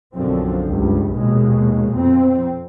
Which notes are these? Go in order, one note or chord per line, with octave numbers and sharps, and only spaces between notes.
B1 F#2 D3 F3 C4
C#2 G2 G3
A#1 D#2 B2 G#3
F2 C4